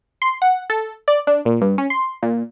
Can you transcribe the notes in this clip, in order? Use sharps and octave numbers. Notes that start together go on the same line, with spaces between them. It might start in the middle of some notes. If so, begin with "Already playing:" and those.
C6
F#5
A4
D5
D4
A#2
G2
C#4
C6
A#2